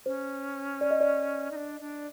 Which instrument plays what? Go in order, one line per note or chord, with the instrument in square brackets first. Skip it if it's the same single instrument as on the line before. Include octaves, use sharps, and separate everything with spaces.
[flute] C#4 [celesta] C5
[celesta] D5
D#5
D5
[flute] D#4
D4
D4